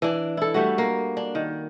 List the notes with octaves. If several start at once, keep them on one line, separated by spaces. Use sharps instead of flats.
E3 D4
E4 A4
G3 A3 F#4
A#3
D4
D#3